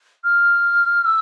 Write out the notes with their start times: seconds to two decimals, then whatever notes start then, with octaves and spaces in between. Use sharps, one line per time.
0.24 F6
1.05 E6